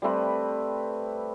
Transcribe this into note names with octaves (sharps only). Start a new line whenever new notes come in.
G3 A3 C4 B4